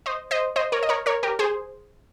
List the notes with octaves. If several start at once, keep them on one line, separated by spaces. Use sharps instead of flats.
C5 D#5
C5 D#5
C5 D#5
A#4 C#5
D#5
A#4 C#5
A#4 C#5
G4 A#4
G#4 C5